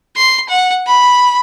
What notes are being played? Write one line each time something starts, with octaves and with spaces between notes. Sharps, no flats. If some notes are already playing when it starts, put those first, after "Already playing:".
C6
F#5
B5